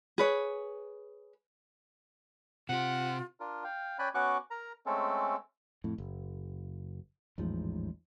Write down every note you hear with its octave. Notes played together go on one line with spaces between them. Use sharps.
G#4 B4 C#5
C3 F4 G4 F#5
D4 F4 A#4
F5 G5
C#4 D5 G5 G#5 B5 F#6
B3 C#4 F#4 C#6 D6 F#6
A#4 A#5
G#3 A3 C4 C#4 A4
F2 A2
F#1
A1 E2 G#2 F3